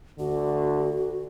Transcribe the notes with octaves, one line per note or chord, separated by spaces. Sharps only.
D2 D3 F#4